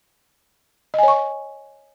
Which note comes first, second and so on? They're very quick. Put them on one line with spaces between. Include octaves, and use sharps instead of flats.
D#5 G#5 C#5 C#6